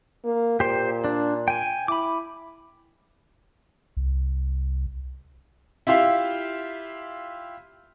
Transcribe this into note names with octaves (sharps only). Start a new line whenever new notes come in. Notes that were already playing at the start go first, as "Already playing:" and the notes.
A#3
A#2 G4 C5
D4
G5 G#5
E4 B5 D6
C2
E4 F4 G4 E5 F5